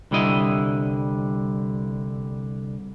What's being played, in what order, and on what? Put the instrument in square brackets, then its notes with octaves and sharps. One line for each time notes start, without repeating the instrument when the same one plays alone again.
[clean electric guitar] C2 D3 G3 E4 D#5